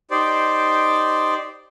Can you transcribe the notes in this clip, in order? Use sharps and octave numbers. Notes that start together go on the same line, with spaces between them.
D#4 G4 C5 D5